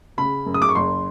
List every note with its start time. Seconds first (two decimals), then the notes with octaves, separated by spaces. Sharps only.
0.17 C#3 B5
0.46 F#2
0.54 D#6
0.62 D6
0.69 C#6
0.75 F#1 C6